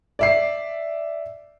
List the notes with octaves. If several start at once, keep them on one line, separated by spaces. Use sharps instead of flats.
D5 E5 C7